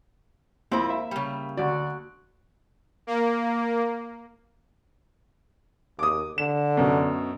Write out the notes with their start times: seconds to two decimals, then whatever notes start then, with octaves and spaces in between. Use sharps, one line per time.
0.72 F2 A#3 C4 E4 C5
0.90 E5
1.11 C#3 G3
1.57 D2 F#4 D5
3.07 A#3
5.99 D#2 D6 D#6
6.38 D3 E7
6.77 F#2 B2